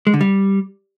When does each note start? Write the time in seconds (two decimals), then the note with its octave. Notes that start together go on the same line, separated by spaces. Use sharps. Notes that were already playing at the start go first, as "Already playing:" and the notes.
0.07 G#3
0.14 D3
0.21 G3